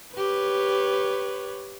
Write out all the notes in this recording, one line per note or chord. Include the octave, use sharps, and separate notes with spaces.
G4 B4 C#5